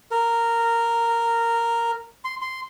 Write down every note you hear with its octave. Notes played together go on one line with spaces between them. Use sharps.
A#4
C6
C6